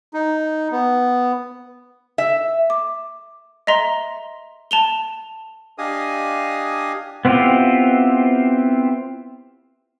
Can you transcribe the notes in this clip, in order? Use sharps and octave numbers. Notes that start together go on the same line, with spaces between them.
D#4
B3
E5
D6
D#5 E5 A#5 C6
A5 F7 G7
D4 G4 D#5 F5 G#5 D#6
B3 C4 E4 F4 G4